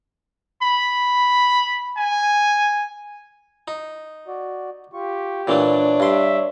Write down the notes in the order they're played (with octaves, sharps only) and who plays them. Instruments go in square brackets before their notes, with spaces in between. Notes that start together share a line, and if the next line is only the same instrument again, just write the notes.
[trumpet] B5
G#5
[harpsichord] D#4
[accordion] F#4 D5
[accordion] F4 C#6 [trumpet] G4
[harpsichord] A#2 E3 A3 [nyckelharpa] D4 [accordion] C#5
[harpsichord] G2 C6 [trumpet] E5